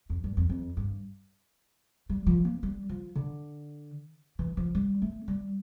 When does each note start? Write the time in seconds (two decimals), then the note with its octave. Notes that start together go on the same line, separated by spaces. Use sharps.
0.10 F2
0.24 G2
0.37 F2
0.49 F2
0.77 G2
2.09 G3
2.27 F3
2.45 A#3
2.63 G3
2.89 F3
3.15 D3
4.39 E3
4.57 F3
4.75 G3
5.02 A3
5.28 G3